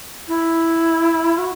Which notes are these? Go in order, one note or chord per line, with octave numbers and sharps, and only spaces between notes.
E4
F#4